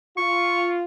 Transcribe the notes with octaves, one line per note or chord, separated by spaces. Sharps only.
F4 C#6